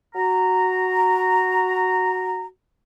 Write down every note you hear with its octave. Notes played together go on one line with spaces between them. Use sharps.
F#4 A#5